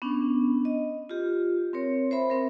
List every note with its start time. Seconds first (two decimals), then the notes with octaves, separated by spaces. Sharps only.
0.02 B3 C#4 D4
0.65 D#5
1.09 F4 G4
1.73 C4 A#4 C#5
2.11 C5 E5 B5
2.30 C4 A#4